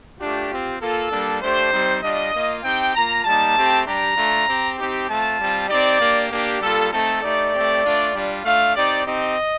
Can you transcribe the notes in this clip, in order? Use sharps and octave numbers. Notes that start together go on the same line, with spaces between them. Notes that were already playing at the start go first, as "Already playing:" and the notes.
A3 D4 F4 G4
C4 F4
A#3 F4 A4
G3 A#3 D4
A3 D4 G4 C5
G3 C4 D#4
G3 D4 F4 D#5
A#3 F4
C4 D#4 G4 G5
A#3 F4 A#5
G3 A#3 D#4 A5
A3 C4 G4
G3 D4 G4 A#5
A3 D4 F4
C4 G4
C4 D#4 G4
A3 C4 F4 A5
G3 C4 F4
C4 D#4 G4 D5
A#3 D4 G4
A#3 D4 G4
G3 A#3 F4 A4
A3 C4 D#4 A4
A3 D#4 G4 D5
A3 C4 G4
A3 D4 F4
G3 D4 F4
A3 D4 F4 F5
C4 D#4 G4 D5
C4 D#4 G4 D#5